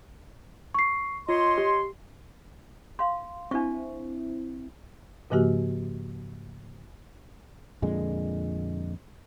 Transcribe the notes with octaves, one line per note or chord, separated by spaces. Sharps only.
C#6 C7
F4 C#5 D#5 C6
G4
F5 C6
C4 D4 E4 C#6
G#2 C#3 F3 A#3 F#4 G4
F2 A#2 D3 G#3